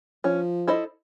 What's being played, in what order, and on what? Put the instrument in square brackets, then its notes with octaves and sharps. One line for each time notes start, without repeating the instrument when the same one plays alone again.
[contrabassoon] F3 [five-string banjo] C#4
[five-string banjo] E4 A4 C5 D#5